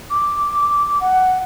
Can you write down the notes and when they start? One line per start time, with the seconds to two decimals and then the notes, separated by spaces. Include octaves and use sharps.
0.10 D6
1.00 F#5